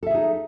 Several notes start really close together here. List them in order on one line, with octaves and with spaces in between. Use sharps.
A4 E5 G#4 D#4